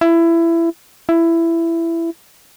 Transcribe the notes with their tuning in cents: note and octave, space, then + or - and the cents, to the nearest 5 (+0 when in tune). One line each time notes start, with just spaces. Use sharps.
E4 +20
E4 +15